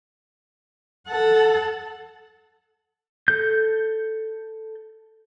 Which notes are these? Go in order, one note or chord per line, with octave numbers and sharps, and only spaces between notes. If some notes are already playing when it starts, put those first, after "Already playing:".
A4 F#5
A4 G6